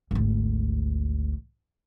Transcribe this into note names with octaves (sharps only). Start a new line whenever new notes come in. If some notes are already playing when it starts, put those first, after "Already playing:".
G#1 D2